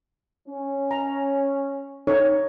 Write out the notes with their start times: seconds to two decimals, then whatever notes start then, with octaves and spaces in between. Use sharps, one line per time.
0.48 C#4
0.91 A#5
2.07 D#4 A4 C#5